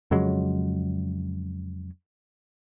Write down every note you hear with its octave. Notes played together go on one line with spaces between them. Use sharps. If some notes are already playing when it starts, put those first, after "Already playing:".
F2 C#3 F#3 G#3